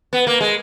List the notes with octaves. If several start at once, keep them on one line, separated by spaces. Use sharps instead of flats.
B3
A#3
G#3